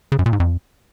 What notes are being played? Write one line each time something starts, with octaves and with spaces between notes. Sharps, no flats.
C#3
F#2
A#2
G#2
F2